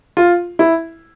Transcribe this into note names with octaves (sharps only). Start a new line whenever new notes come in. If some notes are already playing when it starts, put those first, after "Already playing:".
F4
E4